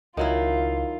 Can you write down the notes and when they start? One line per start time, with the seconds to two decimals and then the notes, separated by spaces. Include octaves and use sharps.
0.17 C#2 D#3 F#3 E4 F4 A#4